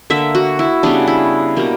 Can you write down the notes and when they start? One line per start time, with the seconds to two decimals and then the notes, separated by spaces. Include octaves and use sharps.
0.10 D3 A#3 E5
0.35 F#4
0.59 E4
0.83 C#3 G3 B3 D4
1.07 E4
1.57 B2 G3 A#3